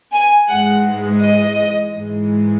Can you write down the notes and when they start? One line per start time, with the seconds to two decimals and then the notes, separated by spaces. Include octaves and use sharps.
0.12 G#5
0.48 G#2 E3 G#3 F#5
1.22 D#5
1.95 G#2 E3 G#3